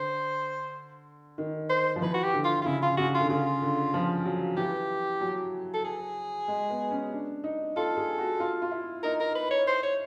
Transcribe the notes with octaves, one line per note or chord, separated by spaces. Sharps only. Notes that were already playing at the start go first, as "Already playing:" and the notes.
Already playing: D3 C5
D#3
C5
F3
E3 B4
F#4
G4
D3
F4
F4
C#3 E4
F4
C#3 F#4
F4
D3
C#3 F4
D3
F3
F#3
E3 G4
F#3
A4
G#4
G#3
B3
C#4
D4
D#4
F4 A4
G#4
F#4
F4
F4
E4
D#4 A#4
A#4
B4
C#5
C5
C#5